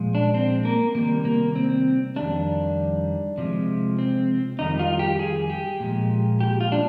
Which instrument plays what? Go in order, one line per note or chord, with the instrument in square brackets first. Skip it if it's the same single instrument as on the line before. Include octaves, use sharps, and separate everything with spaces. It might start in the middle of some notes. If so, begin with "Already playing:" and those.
Already playing: [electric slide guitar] A#2 F3 G#3
D4
C4
A#3
C3 D#3 G3 A#3
A#3
C4
F2 D#3 G3 D4
C3 F3 G#3
C4
F2 D#3 G3 D#4
F4
G4
G#4
G4
A#2 F3 G#3
G4
F4
D4